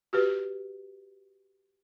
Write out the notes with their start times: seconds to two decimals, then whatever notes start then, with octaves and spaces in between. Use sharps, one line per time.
0.13 F#4 G4 B4